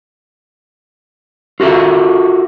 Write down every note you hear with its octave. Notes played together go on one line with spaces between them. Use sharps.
F4 F#4 A4 E5